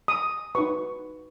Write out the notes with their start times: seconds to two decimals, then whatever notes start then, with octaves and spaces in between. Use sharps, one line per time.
0.08 D#6
0.55 D#4 F#4 B4 C#6